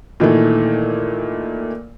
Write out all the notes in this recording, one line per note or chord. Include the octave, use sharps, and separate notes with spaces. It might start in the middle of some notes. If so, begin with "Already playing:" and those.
A#2 D#3 E3 A3